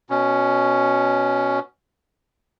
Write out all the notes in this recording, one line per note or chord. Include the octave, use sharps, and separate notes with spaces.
B2 C#4